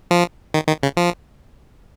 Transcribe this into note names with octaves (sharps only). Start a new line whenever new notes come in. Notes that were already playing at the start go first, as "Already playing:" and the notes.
F3
D#3
D#3
C#3
F3